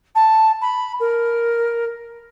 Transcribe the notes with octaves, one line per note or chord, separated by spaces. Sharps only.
A5
B5
A#4